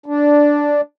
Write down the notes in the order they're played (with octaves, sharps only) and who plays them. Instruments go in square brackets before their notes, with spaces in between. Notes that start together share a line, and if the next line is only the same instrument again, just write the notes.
[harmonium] D4